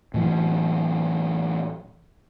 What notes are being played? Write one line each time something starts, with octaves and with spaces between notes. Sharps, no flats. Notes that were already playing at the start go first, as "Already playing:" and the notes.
A2 E3 F#3